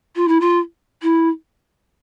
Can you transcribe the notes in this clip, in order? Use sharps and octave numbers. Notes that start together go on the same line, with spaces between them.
F4
E4
F4
E4